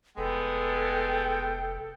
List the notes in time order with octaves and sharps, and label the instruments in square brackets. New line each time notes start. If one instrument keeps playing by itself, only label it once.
[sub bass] F1 [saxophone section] G#3 B3 [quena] A4 [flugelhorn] G5